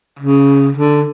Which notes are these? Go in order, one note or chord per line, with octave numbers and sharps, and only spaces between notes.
C#3
D3